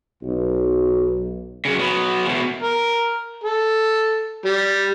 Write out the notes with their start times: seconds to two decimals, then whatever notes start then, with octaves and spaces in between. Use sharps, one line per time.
0.23 B1
1.65 F#2 C#3
1.79 F#3 B3
2.25 E2 B2
2.62 A#4
3.43 A4
4.45 G3